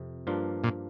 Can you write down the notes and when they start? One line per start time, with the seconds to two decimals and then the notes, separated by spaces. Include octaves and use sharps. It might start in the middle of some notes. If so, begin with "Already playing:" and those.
Already playing: F2 C3
0.27 G2 F3 A#3 D4 F4
0.64 A#2